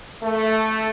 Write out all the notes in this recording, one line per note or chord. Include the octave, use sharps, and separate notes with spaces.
A3